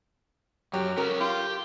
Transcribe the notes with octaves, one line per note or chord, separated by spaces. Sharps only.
F#2 F#3 G4
C#4 F4 A#4
F4 G4